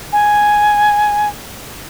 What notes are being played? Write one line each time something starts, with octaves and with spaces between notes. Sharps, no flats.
G#5